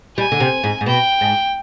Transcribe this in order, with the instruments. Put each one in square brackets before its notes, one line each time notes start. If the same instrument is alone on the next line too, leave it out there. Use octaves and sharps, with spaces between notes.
[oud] G3 [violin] G#5
[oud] D3
C3
G#2
G#2
[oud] B2 [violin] G5
[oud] G#2